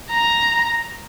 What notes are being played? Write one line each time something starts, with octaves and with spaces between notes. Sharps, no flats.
A#5